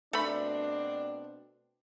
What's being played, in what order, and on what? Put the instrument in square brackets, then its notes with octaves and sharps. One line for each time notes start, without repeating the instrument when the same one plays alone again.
[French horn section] B2 C4 D4 [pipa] A3 B5